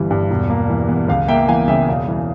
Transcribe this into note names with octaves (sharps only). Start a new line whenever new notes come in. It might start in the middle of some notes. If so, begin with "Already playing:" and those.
Already playing: G1 E3 G3
G2
E1
A#3
E3
E2
C#2 F5
A#3 E5 G5
E3 F5 G#5
C#3 E5 G5
E1 F5
E3